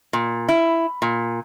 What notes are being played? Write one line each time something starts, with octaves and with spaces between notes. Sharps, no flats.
A#2
E4
A#2